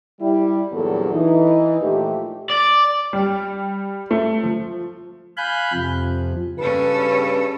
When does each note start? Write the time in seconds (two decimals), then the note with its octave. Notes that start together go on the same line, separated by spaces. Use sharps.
0.21 G3 E4
0.72 E2 G2 A#2 F#3 G3 A4
1.12 E3 D#4
1.81 A#2 F3 A3 G4
2.50 D5
3.13 G3
4.11 A3
4.43 F3
5.37 F5 G#5 B5 F#6 G6
5.73 F2 C3 F3
6.59 G2 C#3 C#4 A4 B4